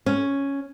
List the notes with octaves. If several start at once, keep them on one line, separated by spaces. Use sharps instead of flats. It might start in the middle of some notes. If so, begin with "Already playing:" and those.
C#4